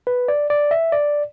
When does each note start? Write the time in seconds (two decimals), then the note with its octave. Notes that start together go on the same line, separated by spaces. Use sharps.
0.07 B4
0.28 D5
0.50 D5
0.71 E5
0.92 D5